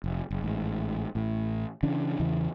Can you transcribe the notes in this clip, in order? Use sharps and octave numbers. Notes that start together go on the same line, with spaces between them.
F1
F#1
A1 G#2
A1 A2
C#3 E3 C#4 D4
E2 C#3 E3